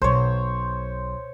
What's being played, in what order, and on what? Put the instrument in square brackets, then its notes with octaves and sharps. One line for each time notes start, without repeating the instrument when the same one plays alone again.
[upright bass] B1 [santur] C5 C#5